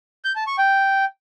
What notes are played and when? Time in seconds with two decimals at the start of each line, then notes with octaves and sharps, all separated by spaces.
0.25 G6
0.36 A5
0.47 C#6
0.58 G5